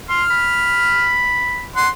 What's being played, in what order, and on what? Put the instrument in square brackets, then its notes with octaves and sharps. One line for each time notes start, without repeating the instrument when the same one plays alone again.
[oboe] C6 [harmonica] F6
[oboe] B5
[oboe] F#5 [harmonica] C6